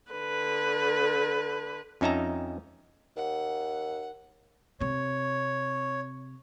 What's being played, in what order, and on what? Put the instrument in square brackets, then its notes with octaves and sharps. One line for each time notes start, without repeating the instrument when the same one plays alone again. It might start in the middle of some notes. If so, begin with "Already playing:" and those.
[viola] D3 B4
[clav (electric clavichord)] F2 C#4 D#4 E5 A5 A#5
[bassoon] D#2 [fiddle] F#5
[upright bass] C3 C4 [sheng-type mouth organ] C#5